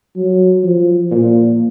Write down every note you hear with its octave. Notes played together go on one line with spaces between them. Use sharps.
F#3
F3
A#2